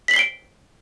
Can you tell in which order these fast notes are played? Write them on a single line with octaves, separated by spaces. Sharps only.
B6 F#7 C7 G7 D7